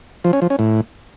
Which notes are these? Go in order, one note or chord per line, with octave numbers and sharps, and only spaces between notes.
F3
C#4
F3
C#4
A2